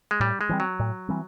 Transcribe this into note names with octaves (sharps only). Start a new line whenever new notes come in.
G#3
A2 G3
G#3
E3 G3 C4
F#3
A2
E3 G3 C4